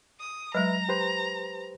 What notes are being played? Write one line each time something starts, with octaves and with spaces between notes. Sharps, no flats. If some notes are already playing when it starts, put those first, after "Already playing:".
D#6
F#3 G#3 B4 E5 A#5
G4 B4 C5